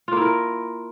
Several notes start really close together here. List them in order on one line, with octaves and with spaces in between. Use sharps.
F4 A#3 E4 A#4